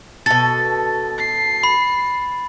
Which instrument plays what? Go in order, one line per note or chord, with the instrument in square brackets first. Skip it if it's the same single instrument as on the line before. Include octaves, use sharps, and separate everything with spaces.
[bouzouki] B2 A4 [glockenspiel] A6
[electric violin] C7
[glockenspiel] B5